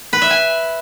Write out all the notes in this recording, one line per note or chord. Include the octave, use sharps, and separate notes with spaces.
B4
E5
G#5